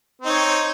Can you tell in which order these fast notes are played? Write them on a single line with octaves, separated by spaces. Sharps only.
C4 D#4 C#5